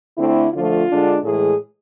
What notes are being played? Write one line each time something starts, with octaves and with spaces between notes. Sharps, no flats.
D3 A3 C4 E4
D3 F3 A3 F4
D3 G#3 D4
A2 E3 G#3 G#4